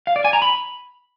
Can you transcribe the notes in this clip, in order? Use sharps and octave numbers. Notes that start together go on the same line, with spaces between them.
F5
D5
G#5
A#5
B5